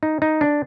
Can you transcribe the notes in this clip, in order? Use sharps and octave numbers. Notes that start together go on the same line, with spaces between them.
D#4
D#4
D4